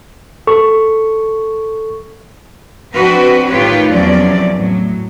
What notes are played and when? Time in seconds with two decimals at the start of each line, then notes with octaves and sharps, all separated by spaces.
0.47 A4 C#6
2.95 F3 C4 D4 F#4 B4
3.48 A2 D#3 F4 G4 B4 C#5
3.90 E2 C3 F3 F#3 C#4 D5
4.54 A2 F#3